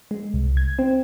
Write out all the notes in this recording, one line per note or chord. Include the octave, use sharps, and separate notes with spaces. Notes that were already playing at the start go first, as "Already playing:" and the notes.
G#3
C2
G#6
C4